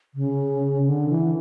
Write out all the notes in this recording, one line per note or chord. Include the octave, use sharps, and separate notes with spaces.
C#3
D3
E3